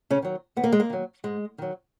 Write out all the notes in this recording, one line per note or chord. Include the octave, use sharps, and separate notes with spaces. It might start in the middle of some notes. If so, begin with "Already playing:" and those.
C#3 C#4
D#3 F#3
D#2 B3
A#3
G#3
A#3
D#3 F#3
G#2 G#3
D#3 F#3